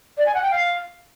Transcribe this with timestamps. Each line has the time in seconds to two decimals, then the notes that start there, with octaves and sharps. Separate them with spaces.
0.18 D5
0.26 G#5
0.34 F#5
0.43 G5
0.51 F5